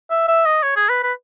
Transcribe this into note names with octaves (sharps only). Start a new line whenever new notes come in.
E5
E5
D#5
C#5
G#4
B4
B4